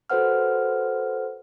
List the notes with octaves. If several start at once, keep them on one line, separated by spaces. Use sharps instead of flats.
F#4 A4 B4 C5 F#5 F6